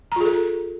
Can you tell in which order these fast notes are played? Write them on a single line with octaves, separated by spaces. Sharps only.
A#5 F4 G#4 A4